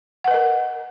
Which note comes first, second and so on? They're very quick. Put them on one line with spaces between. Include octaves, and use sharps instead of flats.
F#5 B4 D#5 A#4